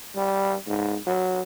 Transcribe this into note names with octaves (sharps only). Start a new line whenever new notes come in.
G3
G#2
F#3